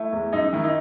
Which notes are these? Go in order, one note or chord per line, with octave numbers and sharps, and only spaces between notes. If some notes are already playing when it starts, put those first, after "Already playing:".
Already playing: A3 E4
E2
F#2 D#4
D#3 E4
D#4